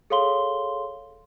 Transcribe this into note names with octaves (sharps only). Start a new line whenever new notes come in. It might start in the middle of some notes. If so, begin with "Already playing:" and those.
G#4 A4 C#5 F5 C6 G7